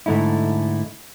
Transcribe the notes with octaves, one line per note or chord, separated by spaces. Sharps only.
G#2 D3 A3 D#4 E4